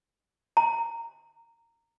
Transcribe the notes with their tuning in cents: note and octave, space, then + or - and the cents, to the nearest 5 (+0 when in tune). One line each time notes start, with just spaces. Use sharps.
A#5 -15